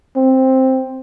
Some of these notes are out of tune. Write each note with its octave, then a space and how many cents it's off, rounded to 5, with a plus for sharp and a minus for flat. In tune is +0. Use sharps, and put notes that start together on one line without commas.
C4 +5